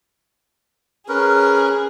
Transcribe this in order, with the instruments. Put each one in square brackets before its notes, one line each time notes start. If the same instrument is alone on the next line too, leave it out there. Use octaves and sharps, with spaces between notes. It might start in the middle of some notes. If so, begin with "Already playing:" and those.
[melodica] C#4 A#4 B4 [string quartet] G#4